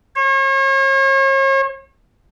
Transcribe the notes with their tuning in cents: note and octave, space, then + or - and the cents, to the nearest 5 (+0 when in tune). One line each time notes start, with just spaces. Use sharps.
C#5 -40